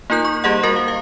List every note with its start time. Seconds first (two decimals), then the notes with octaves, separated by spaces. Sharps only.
0.10 A#3 D#4 F4 A#4 G6
0.25 C#6
0.44 G3 A#3 G4 G#4 D#5 F#5
0.63 G3 F#4 A#4 A#6
0.76 F5
0.88 F5